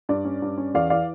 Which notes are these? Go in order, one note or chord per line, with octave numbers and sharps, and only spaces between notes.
G2 D5
C#4
G2
C#4
E2 D5 F5
E3 D5 F5